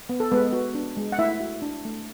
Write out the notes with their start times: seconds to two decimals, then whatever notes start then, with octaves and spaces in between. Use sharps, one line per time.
0.09 B3
0.20 A4
0.31 G#3 B3 B4
0.53 F#4
0.75 D4
0.97 G#3
1.12 F#5
1.19 A3 E4 E5
1.40 F#4
1.62 D4
1.85 A3